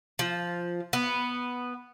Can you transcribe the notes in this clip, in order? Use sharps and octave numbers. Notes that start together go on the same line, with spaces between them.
F3
B3